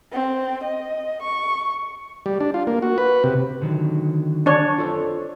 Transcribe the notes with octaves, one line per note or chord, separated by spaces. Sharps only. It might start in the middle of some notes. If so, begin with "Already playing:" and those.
C4
D#5
C#6
G3
D4
F4
A#3
F#4
B4
C3
D3 D#3 F#3
D4 C#5
F4 A4 C5